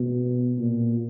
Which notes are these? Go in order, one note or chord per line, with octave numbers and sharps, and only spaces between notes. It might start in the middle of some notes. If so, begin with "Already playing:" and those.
Already playing: B2
A#2